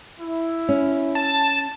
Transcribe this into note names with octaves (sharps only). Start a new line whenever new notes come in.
E4
C#4
A5